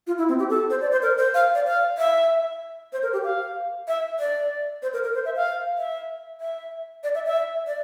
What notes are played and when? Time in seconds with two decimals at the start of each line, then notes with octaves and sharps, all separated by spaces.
0.07 F4
0.18 E4
0.28 C4
0.39 G4
0.49 A4
0.70 C5
0.81 D5
0.92 C5
1.02 A#4
1.18 C5
1.34 F5
1.55 D5
1.66 F5
1.98 E5
2.93 C5
3.03 A#4
3.13 G4
3.24 F5
3.88 E5
4.19 D5
4.82 C5
4.93 A#4
5.04 A#4
5.15 C5
5.25 E5
5.36 F5
5.78 E5
6.41 E5
7.04 D5
7.14 E5
7.25 E5
7.67 D5